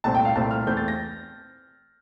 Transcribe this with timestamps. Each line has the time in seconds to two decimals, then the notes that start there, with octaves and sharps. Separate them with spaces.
0.04 C2 A#2 A3 C4 A5
0.15 G5
0.25 F5
0.35 C2 A#2 A3 C4 A5
0.51 F6
0.67 E2 E3 A3 C4 G6
0.77 A6
0.88 A#6